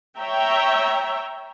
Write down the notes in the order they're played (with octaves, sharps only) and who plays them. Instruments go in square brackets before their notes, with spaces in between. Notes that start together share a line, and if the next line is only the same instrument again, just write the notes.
[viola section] C#5 E5 G5 A#5